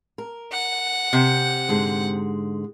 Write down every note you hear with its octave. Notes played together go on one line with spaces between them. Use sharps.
A#4
F#5
C3
G#2 D3 G#3